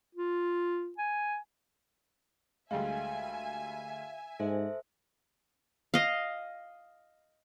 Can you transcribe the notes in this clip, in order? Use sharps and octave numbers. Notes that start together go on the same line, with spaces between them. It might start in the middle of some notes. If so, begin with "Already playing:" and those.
F4
G#5
D2 G3 G#3 E5 F5 G#5
G#2 A4 C5 E5
D#5 F5